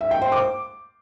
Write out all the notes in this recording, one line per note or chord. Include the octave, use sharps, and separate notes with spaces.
E5
G5
C5
D6